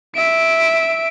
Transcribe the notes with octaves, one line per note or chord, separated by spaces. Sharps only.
E5 D7